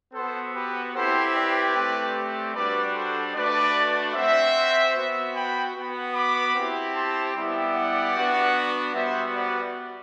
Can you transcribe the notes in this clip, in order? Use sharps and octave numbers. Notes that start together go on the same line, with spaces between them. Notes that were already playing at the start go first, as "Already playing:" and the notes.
B3 F#4 A4 C5
G4 B4
C4 E4 G4 A4 C5
B4 D5
A3 C4 G4
G3 D4 F#4 B4 D5
A4 C5
A3 D4 F#4 B4 D5
C4 F#4 C5 E5
B3 F#4
G5 B5
B3 F#4
B5 D6
C4 E4 G4
A5 C6
G3 B3 E4 G4
D5 F#5
B3 D4 F#4
G3 B3 F#4 C5 E5
B4 D5